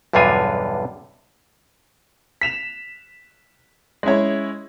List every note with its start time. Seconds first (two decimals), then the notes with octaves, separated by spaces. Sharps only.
0.13 B1 E2 G2 D3 F4 G#5
2.41 B6 E7 F7
4.03 G#3 C#4 E4 C#5